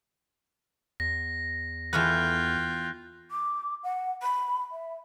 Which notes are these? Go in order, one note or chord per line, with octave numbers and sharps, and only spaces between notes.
E2 A#6
E3 A3 B3 F4 G5 F6 F#6
D6
F#5
B5
E5